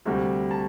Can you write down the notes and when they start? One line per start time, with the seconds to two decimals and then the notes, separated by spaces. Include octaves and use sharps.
0.05 D2 C3 G3
0.51 A5